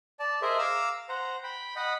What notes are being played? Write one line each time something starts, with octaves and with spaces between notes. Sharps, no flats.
D5 A5
G#4 A#4 C5 D#5 E5
F5 A#5 D6 E6
C5 F#5 A#5
G5 B5
D#5 F#5 B5